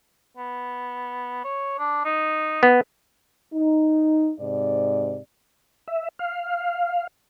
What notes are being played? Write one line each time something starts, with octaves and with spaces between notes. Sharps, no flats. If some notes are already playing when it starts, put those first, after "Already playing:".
B3
C#5
D4
D#4
B3
D#4
G#2 C3 D5
E5
F5